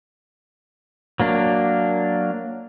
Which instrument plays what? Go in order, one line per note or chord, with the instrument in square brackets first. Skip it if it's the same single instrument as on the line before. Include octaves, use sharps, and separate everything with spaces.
[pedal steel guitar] F#3 A#3 D4